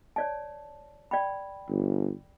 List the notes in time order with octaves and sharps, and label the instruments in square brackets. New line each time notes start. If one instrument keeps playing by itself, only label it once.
[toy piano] C#5 D5 A5
D5 G5 B5
[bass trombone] G1